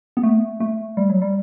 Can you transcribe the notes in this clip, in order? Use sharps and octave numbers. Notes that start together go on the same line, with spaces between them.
B3
A3
A3
G3
F#3
G3